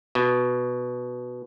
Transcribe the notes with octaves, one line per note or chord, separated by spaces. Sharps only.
B2